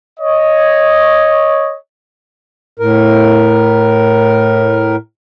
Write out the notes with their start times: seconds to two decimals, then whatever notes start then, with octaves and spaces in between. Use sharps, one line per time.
0.20 C#5 D#5
2.79 A2 A#4